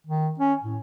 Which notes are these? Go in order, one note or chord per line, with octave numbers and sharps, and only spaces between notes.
D#3
C#4
A2